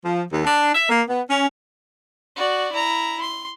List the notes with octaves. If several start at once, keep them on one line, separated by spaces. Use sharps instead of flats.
F3
D#2
D4
E5
A#3
B3
C#4
F#4 D5
E4 A#5
C6